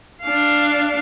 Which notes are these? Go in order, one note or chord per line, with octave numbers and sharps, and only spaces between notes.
D4 F5